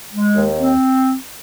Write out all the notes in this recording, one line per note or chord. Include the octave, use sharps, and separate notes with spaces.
G#3
D#2
C4